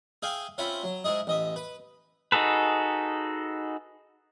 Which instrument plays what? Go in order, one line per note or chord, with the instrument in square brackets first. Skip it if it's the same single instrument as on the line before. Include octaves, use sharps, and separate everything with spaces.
[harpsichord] G#4 E5 F5 G5 G#5
C4 C#4 F4 E5 F#5 B5
F#3
G#2 E4 G#4 D#5
A1 D#5 E5
B4
[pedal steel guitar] D#4 F#4 G#4 A4 B4